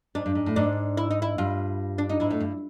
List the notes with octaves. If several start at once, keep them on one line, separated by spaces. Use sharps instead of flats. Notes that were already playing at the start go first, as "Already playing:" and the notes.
G#2 D4
G2
G#2
A2
G#2 D4
E4
D#4
E4
G2 F4
D4
D#4
G#2 E4
A2
G2